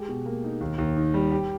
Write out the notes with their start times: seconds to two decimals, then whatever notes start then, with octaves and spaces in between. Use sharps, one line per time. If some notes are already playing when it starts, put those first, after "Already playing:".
Already playing: G#3 G4
0.09 B2
0.26 A#3
0.44 D#4
0.61 D#2
0.78 D#2
0.97 D#3
1.14 G3
1.32 G4